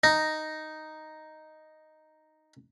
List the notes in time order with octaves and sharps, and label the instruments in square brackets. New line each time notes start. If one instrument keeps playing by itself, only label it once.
[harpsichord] D#4 [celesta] A#6